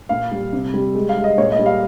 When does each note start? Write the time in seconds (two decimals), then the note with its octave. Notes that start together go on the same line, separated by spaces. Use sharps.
0.09 A#2 F5
0.31 G3
0.53 C3
0.74 G3
0.95 G#3
1.09 F5
1.17 G#3
1.24 D#5
1.38 A#2 C#5
1.52 D#5
1.59 G3
1.66 F5